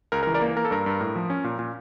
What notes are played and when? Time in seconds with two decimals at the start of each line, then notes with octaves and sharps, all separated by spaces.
0.12 C#2 A#4
0.23 A#4
0.27 E3
0.34 A#4 D5
0.42 A#3
0.57 A#3 A#4
0.65 A4
0.71 G2 A#4
0.86 G2
1.01 A2
1.16 F3
1.30 C#4
1.44 A#2
1.59 A#2